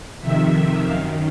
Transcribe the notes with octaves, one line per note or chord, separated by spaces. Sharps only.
F2 C3 D#3 E5
F#2 D#3 F5